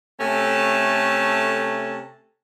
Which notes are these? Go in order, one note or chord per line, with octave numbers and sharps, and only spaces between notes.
C3 A3 C#4 A4 A5